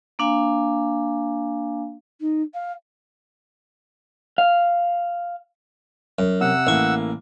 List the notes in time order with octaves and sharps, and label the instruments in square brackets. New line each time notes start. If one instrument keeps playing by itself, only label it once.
[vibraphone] A#3 D4 F5 G#5
[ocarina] D#4
F5
[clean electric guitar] F5
[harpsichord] F#2
[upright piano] C3 [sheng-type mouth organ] F#5 E6
[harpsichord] A1 C#6 [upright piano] A#3 E4